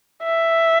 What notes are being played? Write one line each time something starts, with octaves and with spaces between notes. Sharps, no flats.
E5